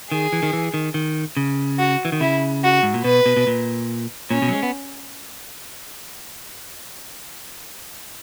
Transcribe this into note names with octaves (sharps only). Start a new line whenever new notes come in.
D#3 G#4
E3
D#3
E3
D#3
D#3
C#3
F#4
E3
D#3
C#3 E4
F#4
G#2
A#2
B2 B4
B2
B2
A#2
A#2 C#4
B2
F#3
G#3
B3